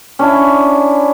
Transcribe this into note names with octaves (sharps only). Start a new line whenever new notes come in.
C#4 D4 E4